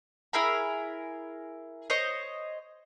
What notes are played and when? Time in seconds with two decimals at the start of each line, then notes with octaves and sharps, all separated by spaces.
0.33 E4 G#4 A#4 B5
1.90 C5 C#5 D#5 C#6